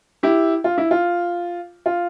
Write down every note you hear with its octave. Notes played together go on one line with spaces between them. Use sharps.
E4 G4
F4
E4
F4
F4